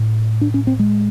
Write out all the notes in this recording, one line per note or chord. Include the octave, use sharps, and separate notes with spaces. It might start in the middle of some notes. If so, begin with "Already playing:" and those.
Already playing: A2
D4
C#4
C4
G#3